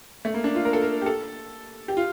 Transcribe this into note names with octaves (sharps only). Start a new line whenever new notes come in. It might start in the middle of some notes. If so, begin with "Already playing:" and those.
A3
A#3
D4
F4
A#4
A4
A#4
G4
A4
G4
F4